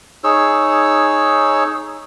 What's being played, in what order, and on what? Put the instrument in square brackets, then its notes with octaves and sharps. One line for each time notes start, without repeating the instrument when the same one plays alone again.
[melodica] D#4 G#4 C#5 E6